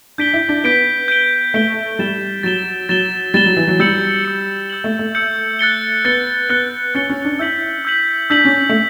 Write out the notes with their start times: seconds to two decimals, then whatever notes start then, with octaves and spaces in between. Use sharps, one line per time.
0.18 D4 G6 B6 D7 G7
0.34 E4
0.49 D4
0.64 B3 G6 B6 D7 G7
1.08 G6 B6 D7 G7
1.54 A3 G6 B6 D7 G7
1.99 G3 A6 E7 G7
2.43 F#3 A6 E7 G7
2.89 F#3 A6 E7 G7
3.34 G3 A6 E7 G7
3.46 F#3
3.57 E3
3.68 F#3
3.79 G3 E6 G6 C#7 F#7
4.24 E6 G6 C#7 F#7
4.70 E6 G6 C#7 F#7
4.84 A3
4.99 A3
5.15 E6 G6 C#7 F#7
5.59 F#6 A6 C#7 G7
6.05 B3 F#6 A6 C#7 G7
6.49 B3 F#6 A6 C#7 G7
6.94 C#4 F#6 A6 C#7 G7
7.10 C#4
7.25 D4
7.39 E4 E6 G6 B6 F#7
7.85 E6 G6 B6 F#7
8.30 D4 E6 G6 B6 F#7
8.45 C#4
8.69 A3